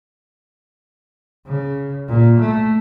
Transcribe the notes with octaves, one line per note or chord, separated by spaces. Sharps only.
C#3
A#2
A3